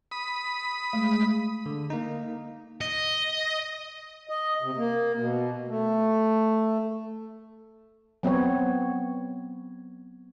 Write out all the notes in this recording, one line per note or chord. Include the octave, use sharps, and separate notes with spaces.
B5 D#6
G#3 A3
D3
A#3 D#4
D#5
D#5
C3
A#3
B2
A3
F#3 B3 C4 C#5